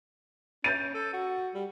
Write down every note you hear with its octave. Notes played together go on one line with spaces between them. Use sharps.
C#4 G6 A6 D#7
A4
F#4
G3